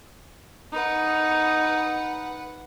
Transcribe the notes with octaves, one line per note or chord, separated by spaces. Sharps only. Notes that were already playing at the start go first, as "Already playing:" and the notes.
D#4 B4 F#5